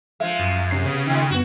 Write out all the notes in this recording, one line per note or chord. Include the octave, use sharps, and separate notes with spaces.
F3 G#3 E5 F5
F#2
C3 C#4 C7
C#3 B3
A2 D#3
F#2 B3 F#4